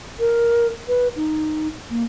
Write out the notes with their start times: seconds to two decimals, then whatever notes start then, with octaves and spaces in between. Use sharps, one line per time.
0.20 A#4
0.88 B4
1.16 D#4
1.90 A#3